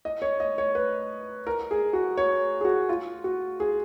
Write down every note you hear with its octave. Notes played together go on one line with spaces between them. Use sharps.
D#5
C#5
D#5
C#5
B4
A#4
G#4
F#4
C#5
G#4
F#4
F4
F#4
G#4